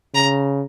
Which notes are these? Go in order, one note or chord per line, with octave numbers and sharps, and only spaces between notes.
C#3 A#5